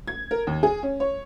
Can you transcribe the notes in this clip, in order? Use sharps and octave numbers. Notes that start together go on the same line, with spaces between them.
G#6
A#4
D#2
G#4
C#4
C#5